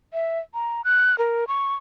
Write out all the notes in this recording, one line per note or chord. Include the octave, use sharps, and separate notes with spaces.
E5
A#5
F#6
A#4
C#6